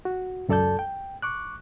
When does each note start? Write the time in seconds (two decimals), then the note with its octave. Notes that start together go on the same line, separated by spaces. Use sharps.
0.05 F#4
0.48 C#2 F#2 A4 D5 A5 G6
0.79 G5
1.22 C#6 D6 F#6